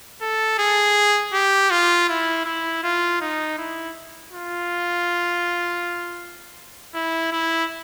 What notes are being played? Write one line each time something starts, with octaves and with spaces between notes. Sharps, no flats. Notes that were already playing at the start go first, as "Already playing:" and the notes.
A4
G#4
G4
F4
E4
E4
F4
D#4
E4
F4
E4
E4